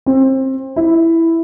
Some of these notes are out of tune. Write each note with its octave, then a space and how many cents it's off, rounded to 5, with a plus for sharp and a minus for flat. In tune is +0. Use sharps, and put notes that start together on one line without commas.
C4 +25
E4 +0